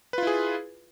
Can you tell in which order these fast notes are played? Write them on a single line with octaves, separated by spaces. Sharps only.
B4 F4 E4 G#4